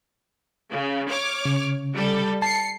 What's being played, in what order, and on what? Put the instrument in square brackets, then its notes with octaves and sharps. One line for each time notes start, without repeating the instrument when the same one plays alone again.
[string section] C#3
C#5 D6 F6
[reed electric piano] C#3
[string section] G3 A4
[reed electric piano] A5 [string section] C7 C#7